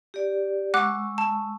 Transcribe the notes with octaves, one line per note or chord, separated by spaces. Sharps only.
G4 D5
G#3 F#5 C#6 D6 E6 F#6
A5